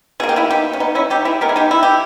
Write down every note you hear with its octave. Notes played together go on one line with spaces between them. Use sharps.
B2 A#3 G#4
G4
E4 G#4
D#4 G4
C#4
B3 D#4
C#4 E4
D#4 G4
E4 G#4
E3 G#3 B3 G4 A#4
G#4
D#4 G4
E4
G4